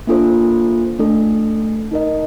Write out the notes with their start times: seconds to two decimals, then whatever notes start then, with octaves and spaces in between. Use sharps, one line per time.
0.07 A#3 D4 F4 A4 C5
0.99 A3 D4 A4
1.91 D#4 A#4 D#5